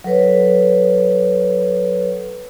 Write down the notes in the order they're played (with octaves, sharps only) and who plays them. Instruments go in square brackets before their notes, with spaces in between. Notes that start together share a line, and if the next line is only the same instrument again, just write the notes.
[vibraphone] F#3 A4 B4 C#5